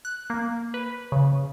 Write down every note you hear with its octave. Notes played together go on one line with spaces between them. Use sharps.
F#6
A#3
B4
C#3